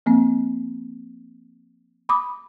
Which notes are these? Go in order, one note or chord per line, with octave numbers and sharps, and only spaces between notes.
F3 A#3 C4
B5 D6 D#6